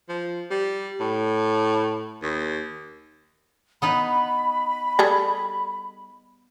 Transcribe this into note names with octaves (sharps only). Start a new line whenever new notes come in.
F3
G3
A2
D#2
B3 D#4 B4 B5
G3 G#4 A4